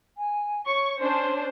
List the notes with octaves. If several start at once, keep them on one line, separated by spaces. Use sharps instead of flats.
G#5
C#5 C#6
C#4 D4 C5 C6